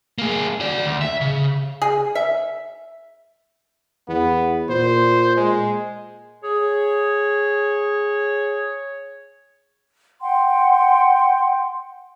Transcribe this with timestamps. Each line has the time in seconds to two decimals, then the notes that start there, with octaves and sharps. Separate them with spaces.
0.18 A#3 G#4
0.60 F#4 D5
0.86 D2
1.01 E5
1.21 C#3
1.82 G#4
2.15 E5
4.08 E2 B3
4.69 A#2 C5
5.37 G#3
6.43 G#4 C#5
10.21 F#5 G5 C6